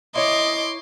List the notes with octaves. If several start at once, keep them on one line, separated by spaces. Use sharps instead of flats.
E4 C#5 D#5 C6 D6